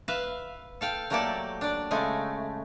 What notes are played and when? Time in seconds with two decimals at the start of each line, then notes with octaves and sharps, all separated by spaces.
0.08 B4 E5 F5
0.81 A4 F5 G5
1.10 F#3 A3 A#3 G4 A4 D5
1.61 D4 D5
1.91 C#3 G#3 A3 G#5